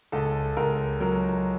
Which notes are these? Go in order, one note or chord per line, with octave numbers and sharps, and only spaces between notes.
C#2 A4
C#2 A#4
F#3 A#4